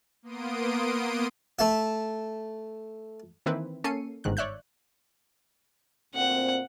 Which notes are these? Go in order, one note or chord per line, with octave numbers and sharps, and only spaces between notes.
A#3 B3 C6 D#6 D7
A3 E5
D#3 E3 A#3 C4 E4 B4
A#3 C#4 A4 C7 C#7 D#7
G1 G#2 D#3 F#6
C#5 D5 E5 F#6 G6
D2 A#2 C4 F#5